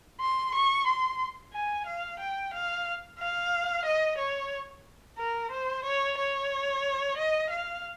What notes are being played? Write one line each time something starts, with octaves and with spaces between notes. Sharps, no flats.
C6
C#6
C6
G#5
F5
G5
F5
F5
D#5
C#5
A#4
C5
C#5
C#5
D#5
F5